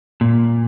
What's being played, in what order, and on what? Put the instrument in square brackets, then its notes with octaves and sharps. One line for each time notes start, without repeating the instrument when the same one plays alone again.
[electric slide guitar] A#2